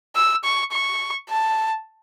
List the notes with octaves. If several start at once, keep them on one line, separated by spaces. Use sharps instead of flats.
E6
C#6
C#6
A5